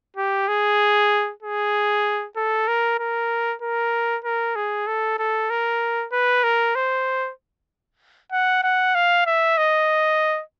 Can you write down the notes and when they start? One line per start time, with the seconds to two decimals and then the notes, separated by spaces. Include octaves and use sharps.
0.17 G4
0.48 G#4
1.42 G#4
2.36 A4
2.68 A#4
2.99 A#4
3.62 A#4
4.24 A#4
4.56 G#4
4.87 A4
5.19 A4
5.50 A#4
6.12 B4
6.44 A#4
6.75 C5
8.32 F#5
8.63 F#5
8.95 F5
9.26 E5
9.58 D#5